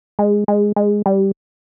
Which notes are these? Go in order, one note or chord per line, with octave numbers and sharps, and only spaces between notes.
G#3
G#3
G#3
G3